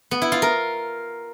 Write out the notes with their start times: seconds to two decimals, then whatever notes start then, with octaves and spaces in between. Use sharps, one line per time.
0.11 B3
0.22 E4
0.32 F4
0.42 A#4